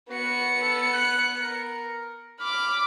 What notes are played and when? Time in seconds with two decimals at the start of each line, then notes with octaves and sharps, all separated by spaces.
0.10 B3 F#4 C#7
0.62 A4
0.94 F#6
1.40 A#4
2.40 B5 D6 F6